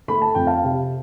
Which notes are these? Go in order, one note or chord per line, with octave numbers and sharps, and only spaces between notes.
A3 B5
A5
F2 G5
F5 A5
C3